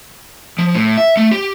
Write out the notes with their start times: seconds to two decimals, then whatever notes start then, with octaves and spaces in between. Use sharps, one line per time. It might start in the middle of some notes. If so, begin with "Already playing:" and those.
0.58 F3
0.75 A2
0.97 E5
1.17 A3
1.31 G4